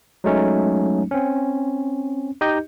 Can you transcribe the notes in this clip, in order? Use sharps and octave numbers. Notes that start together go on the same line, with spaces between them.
F#3 G#3 A3 C#4 D#4
C4 C#4
D#4 G4 D#5 G6